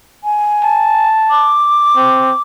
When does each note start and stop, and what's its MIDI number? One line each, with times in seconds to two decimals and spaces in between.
0.24 1.08 80
0.64 1.55 81
1.30 2.42 86
1.97 2.34 60